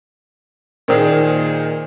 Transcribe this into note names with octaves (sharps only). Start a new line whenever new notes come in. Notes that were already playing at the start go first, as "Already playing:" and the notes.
A#2 D#3 G#4 A#4 C5 D5